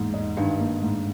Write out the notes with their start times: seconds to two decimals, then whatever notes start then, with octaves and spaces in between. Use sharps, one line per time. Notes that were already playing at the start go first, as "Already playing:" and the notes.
Already playing: E2 G#2 A#3
0.14 D#4
0.37 G2 D#3
0.60 A#3
0.82 G#2